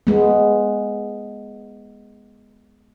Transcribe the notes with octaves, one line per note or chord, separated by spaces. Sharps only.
G#3 B3